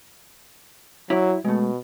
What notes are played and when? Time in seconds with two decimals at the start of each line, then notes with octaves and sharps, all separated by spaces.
1.10 F#3 E4 C#5 D5
1.45 B2 G#3 A3